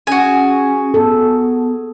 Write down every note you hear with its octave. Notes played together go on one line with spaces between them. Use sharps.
C#4 F#4 G#4 G#5
B3 A4